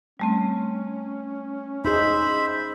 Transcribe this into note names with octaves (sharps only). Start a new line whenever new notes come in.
G3 A3 C4 C#4
D#4 G#4 C5 E5 B5